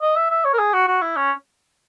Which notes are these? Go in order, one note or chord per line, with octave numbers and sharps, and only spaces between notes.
D#5
E5
E5
C#5
A#4
G#4
F#4
F#4
E4
C#4